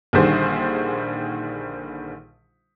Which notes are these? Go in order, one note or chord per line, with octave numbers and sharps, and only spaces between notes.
A#1 D3 D#3 G3 G#4 C5